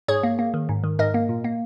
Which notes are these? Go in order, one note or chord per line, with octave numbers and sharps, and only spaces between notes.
G#2 G#4 C#5
A#3
A#3
D#3
G#2
D#3
G#2 A#4 D#5
A#3
A#2
A#3